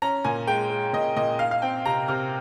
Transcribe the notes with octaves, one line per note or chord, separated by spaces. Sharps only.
C#4 A#5
A#2 G#5
G#3 G5
G#3
A#2 D#5
A#2 D#5
D#4 F5
F5
C4 G5
C3 A#5
C3 F6